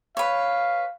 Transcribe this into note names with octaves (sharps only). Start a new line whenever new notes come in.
B4 C#5 F5